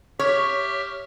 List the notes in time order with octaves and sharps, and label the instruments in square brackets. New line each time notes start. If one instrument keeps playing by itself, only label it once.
[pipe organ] G4 E5 F6 [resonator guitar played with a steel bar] C#5